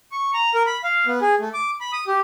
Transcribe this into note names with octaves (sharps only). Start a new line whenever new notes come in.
C#6
A#5
A#4
B5
F5
B3
G#4
A3
D6
B5
D#6
G4